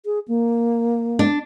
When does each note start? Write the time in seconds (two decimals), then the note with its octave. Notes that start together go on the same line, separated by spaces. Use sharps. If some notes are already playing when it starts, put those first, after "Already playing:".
0.05 G#4
0.28 A#3
1.19 D4